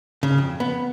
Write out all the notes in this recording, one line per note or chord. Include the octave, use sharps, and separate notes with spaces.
C#3
F2
B3